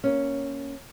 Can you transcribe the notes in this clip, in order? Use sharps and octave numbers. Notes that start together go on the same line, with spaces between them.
A#3 C#4